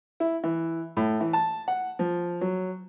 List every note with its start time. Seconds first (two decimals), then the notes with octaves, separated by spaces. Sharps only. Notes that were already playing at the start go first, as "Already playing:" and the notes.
0.20 E4
0.44 E3
0.97 A2
1.21 E3
1.33 A5
1.68 F#5
1.99 F3
2.41 F#3